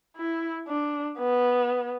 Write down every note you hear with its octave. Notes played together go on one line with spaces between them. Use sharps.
E4
D4
B3